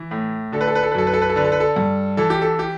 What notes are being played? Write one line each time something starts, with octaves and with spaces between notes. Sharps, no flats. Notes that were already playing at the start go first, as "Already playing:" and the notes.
Already playing: E3
A2
D3 A4
B4
A4
B4
A4
B4
F#2 A4
B4
A4
B4
A4
D3 B4
A4
B4
A4
G2
E3 A4
G4
A4
G4